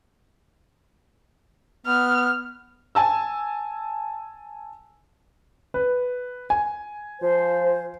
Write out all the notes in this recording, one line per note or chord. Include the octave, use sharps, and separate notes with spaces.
B3 F6
G#5 A5 E6
B4
G#5
F3 C5